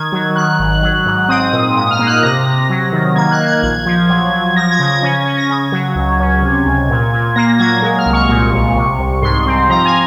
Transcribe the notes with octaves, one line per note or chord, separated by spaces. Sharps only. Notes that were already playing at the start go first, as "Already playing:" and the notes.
Already playing: D#3 G#6
F#3
D#3 F#6
G#1
F#3
G#2
C4 D#6
A#2
G#2 D#6
F6
A#3
F#6
C3 A#6
C3
F#3
D#3
A#3 G#6
F#6
A#3
G#6
A#1 G#6
F3
F#3
F#3
F3 A#6
G#6
C#3
G#6
C#4
C#4
A#6
C#3 G#6
F#3
C#2
C#4
C3
C#2
A#2
A#2
A#3 A#6
F#3 G#6
G#3
F6
C2
C#6
A#2
A#1
C3
C2
G#2 C6
C4
F3 A#5
G#5